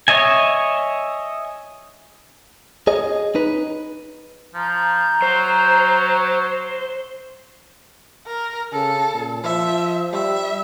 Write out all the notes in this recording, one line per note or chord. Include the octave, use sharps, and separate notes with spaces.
C#5 D#5 E5 G#5
G#4 C#5 D#5
D#4 B4
F3 A#5 C6 G6
F#3 C5
A#4
C#3 A4
A#2
F3 E5
G3 E5